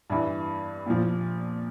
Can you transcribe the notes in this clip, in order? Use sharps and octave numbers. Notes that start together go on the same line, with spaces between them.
G2 E3
A#2 F3